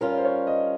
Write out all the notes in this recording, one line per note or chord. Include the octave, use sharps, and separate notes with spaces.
G2 G3 C#4 F4 A#4
C5
C#5
D#5